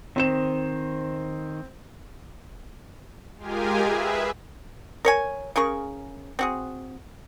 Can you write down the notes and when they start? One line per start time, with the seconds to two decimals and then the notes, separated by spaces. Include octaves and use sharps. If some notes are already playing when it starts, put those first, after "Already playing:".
0.16 D#3 C4 C5 E7
3.38 G#3 F4 G4 G#4 A#4 G#5
3.83 G#4 B4 E5
5.05 A#4 C#5 G#5
5.56 C#3 G#4 A#4 C#6
6.39 C4 F#4 G#4